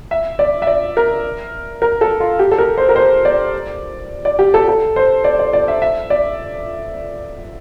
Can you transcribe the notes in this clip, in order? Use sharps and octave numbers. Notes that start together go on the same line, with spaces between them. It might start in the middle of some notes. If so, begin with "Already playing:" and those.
E5
D5
E5
D5
A#4
A#4
A4
F4
G4
A4
A#4
C5
A#4
C5
D5
D5
G4
A4
A4
C5
D5
D5
D5
E5
E5
D5